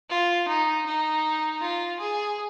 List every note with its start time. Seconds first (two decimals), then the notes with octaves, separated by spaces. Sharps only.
0.09 F4
0.48 D#4
0.86 D#4
1.61 F4
1.99 G#4